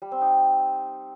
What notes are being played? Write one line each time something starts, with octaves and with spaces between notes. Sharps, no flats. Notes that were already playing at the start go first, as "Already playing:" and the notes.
G3
C4
D#4